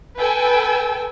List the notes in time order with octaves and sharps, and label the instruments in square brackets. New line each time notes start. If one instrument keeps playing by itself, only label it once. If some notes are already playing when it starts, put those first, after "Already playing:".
[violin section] A4 B4 G5 G#5 E6